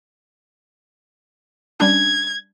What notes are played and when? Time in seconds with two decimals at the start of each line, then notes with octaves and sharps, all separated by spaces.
1.80 G3 C#4 D4 G#6